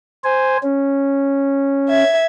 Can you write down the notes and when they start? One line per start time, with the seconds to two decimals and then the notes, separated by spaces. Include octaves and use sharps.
0.24 C5 G#5
0.63 C#4
1.88 E5 G#6